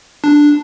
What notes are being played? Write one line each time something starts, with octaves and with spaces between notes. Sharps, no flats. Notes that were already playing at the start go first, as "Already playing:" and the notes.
D4